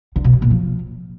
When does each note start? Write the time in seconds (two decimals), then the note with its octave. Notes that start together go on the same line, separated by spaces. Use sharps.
0.16 D3
0.24 B2
0.33 D3
0.42 A#2
0.51 F3